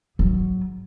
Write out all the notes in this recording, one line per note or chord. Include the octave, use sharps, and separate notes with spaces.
G#2 F#3